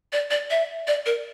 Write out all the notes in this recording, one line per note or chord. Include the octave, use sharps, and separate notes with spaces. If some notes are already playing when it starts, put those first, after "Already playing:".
D5
D5
E5
D5
A#4